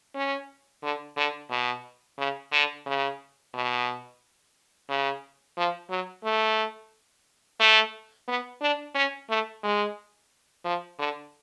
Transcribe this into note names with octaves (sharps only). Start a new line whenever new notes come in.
C#4
D3
D3
B2
C#3
D3
C#3
B2
C#3
F3
F#3
A3
A3
B3
D4
C#4
A3
G#3
F3
D3